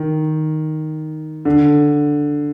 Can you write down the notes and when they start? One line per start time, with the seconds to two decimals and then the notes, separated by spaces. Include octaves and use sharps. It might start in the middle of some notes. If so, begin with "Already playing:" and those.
Already playing: D#3
1.45 D3